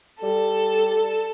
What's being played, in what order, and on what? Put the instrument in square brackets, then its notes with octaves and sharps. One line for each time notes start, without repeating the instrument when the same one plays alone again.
[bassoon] G3 [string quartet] A4